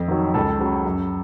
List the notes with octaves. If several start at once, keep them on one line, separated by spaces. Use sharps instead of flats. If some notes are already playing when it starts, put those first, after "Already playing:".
Already playing: F2
D#3 F#3
C#2 A4
C#3 F#3
F#2